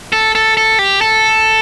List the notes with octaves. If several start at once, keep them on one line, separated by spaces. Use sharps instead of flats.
A4
A4
A4
G4
A4